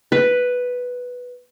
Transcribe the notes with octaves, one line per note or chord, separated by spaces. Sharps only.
B4